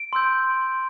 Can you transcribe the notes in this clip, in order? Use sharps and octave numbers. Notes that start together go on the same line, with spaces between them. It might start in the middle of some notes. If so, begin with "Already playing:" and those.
Already playing: D7
C6 E6 G6